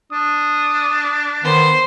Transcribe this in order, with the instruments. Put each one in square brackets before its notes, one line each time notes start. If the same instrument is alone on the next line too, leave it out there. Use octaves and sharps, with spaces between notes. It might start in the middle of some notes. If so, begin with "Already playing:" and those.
[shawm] D4 [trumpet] D#6
[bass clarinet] D#3 [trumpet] B3 [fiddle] C5